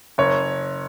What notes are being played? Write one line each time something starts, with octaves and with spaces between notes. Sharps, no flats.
F#1 C#5